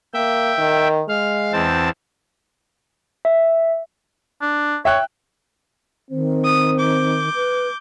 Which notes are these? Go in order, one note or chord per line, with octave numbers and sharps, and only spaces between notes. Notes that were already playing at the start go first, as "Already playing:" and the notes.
A#3 E5 G5
D#3
G#3 F5
E2 C4 A5
E5
D4
C#5 E5 G5 F#6
D#3 C4
D#6
D6 G6
B4